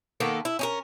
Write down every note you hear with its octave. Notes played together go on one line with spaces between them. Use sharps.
D#3 A#3 B3 A4
E4
C#4 D#4 A#4